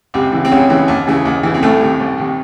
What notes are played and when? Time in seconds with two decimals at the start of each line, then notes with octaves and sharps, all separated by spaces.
0.14 C#2 C3 C4
0.32 C#3 E3
0.45 C4
0.51 C#2 C#3 C#4
0.70 C#3 E3
0.88 D#2
1.07 C#3 E3
1.25 D#2
1.43 C#3 E3
1.54 C4
1.62 C2 A2 A3
1.81 C3 D#3
2.00 C2
2.18 C3 D#3